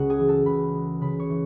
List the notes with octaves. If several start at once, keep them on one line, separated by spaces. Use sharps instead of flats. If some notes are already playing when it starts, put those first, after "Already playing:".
Already playing: C#2 C#3 G#3 F#4 F#5
G#4 G#5
E3
A4 A5
C#2 B4 B5
G#3
C#3 B4 B5
C#5 C#6
E3